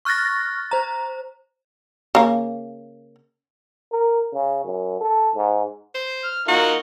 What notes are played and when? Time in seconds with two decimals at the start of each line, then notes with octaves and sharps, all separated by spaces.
0.05 C#6 F6 F#6 A6 A#6
0.71 C5 A#5
2.15 C#3 A#3
3.92 A#4
4.34 C#3
4.64 F#2
5.00 A4
5.36 G#2
5.95 C5
6.24 F6
6.48 D#4 F4 F#4 A#4